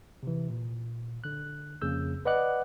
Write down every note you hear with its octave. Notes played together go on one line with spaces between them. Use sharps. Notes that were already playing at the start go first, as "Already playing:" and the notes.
C3 E3
A#2
D3 F#6
F2 C#3 A#3 E6 G6
B4 D5 D#5 F#5 D6 F#6